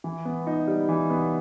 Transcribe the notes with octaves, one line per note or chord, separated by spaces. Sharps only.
E3
B3
D#4
G3
E3
B3